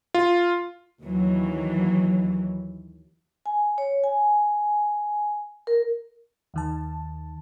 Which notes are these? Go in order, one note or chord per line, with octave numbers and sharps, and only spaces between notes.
F4
D#2 E3 F#3
G#5
C#5
G#5
A#4
D#2 D#3 A5